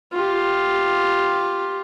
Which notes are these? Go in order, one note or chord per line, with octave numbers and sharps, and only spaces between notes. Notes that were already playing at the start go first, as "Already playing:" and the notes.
F4 G4